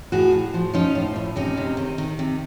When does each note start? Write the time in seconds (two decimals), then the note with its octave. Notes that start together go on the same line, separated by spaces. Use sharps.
0.12 A2 F#4 G#4
0.33 A2
0.54 F3
0.74 F3 C#4 D#4
0.95 A2
1.16 A2
1.36 C3 C#4 D#4
1.57 C3
1.77 D#3
1.98 D#3
2.19 C3